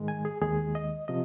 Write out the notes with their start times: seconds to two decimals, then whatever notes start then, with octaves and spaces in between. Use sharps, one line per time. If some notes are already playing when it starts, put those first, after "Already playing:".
Already playing: G#2 D#3 G#3
0.08 G#5
0.25 G#4
0.42 D#2 D#3 G#3 G#4
0.75 D#5
1.08 C3 F3 D#5